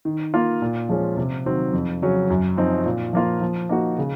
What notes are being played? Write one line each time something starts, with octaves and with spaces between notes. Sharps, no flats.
D#3
A#3 F4
A#2
F3 G#3 C#4
C3
D#3 F#3 C4
F2
C#3 F#3 C#4
F#2
F3 C4 D#4
A#2
F3 A#3 F4
F3
A#3 D#4 F#4
C#3